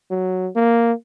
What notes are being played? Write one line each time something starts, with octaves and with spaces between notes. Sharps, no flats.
F#3
A#3